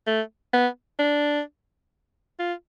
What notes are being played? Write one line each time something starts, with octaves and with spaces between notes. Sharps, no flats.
A3
B3
D4
F4